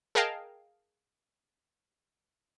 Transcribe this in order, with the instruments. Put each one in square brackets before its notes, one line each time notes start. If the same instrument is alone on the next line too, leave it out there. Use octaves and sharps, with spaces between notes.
[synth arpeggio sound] G#4 A#4 D#5 F5 G5 A5